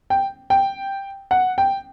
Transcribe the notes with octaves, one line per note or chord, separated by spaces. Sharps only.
G5
G5
F#5
G5